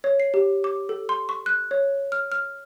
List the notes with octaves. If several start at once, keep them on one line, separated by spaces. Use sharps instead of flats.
C#5
C7
G4
D6
A4
C6
C#6
F#6
C#5
F6
F6